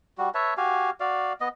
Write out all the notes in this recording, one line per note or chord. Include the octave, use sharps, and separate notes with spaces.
G3 F#4
B4 C#5 E5 A5
F#4 G4 F5 G#5
F#4 D5 F5
B3 D#5